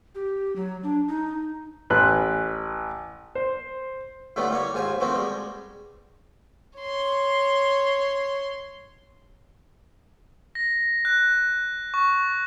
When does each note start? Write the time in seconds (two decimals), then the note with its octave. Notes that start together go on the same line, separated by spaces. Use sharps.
0.15 G4
0.56 F#3
0.83 D4
1.08 D#4
1.90 A1 B4 G#5 C6 F#6
3.35 C5
4.36 A2 D3 G3 A3 B3 F4
4.50 G3 A#3 C#5
4.74 D#2 G#2 F4 G#5
5.00 B2 F3 A3 A#3 C4
5.14 G3 G#3
6.78 C#5 C6
10.55 A#6
11.05 F#6
11.94 C#6